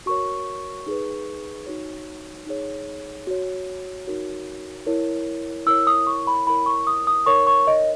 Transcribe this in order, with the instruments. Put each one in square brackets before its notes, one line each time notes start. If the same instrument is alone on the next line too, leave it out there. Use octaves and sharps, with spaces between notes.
[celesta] F#4 A#4 C#5 C#6
D#4 G#4 B4
D#4 F#4 C#5
D#4 G#4 C#5
F#4 C#5
D#4 F#4 A#4 C#5
E4 A#4 C#5
E4 A#4 C#5 E6
D#6
C#6
B5
E4 A#4 C#5 B5
C#6
D#6
D#6
D#4 A#4 C#5 C#6
C#6
D#5